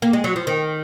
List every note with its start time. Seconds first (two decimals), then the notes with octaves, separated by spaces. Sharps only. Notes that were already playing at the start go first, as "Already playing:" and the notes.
0.02 A#3
0.13 G#3
0.24 F#3
0.36 F3
0.47 D#3